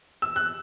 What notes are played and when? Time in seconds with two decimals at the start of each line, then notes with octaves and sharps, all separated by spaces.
0.22 E6
0.36 F#6